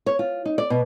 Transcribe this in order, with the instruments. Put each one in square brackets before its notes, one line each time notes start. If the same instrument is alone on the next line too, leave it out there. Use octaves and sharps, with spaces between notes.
[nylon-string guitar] C#5
F4
D#4
D5
B2